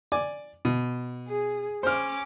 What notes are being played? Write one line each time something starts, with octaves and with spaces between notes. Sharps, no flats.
D5 G#5 D6
B2
G#4
C#4 C5 D6 F6